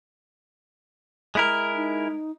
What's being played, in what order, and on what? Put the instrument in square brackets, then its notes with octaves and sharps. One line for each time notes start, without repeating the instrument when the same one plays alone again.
[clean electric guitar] G#3 E4 A#4
[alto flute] D#4